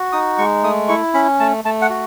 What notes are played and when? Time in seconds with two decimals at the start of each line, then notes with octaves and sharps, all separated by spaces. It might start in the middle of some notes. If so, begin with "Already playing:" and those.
Already playing: F#4
0.12 D#4 D#6
0.38 G#3 C#6
0.63 A3 D#6
0.88 E4 C#6
1.14 C#4 B5
1.40 A3 A5
1.65 A3 A5
1.82 F#5
1.90 F#4